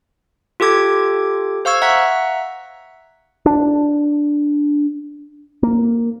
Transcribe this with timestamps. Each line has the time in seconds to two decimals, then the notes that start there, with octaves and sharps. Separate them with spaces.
0.60 F4 G4 A4 D6 G#6
1.65 C5 F5 C#6 E6 G#6
1.81 E5 F#5 A#5 F#6 B6
3.46 D4
5.63 A#3